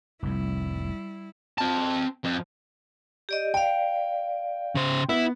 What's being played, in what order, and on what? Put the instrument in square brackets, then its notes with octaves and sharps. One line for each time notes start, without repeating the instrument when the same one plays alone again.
[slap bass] F1 C2 F2 [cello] G3 E4
[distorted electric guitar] C4 A5
F2
[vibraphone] G4 D5 D#5
[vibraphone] D5 F5 [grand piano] G5
[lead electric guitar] C#3 C5
[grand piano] B3 [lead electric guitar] E4